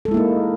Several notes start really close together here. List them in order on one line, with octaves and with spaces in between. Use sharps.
A4 G#3 E4 A#3 D#4